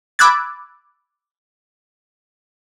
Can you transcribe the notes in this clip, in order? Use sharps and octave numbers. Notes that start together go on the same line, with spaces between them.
B5 D6 E6 F#6 G#6 A6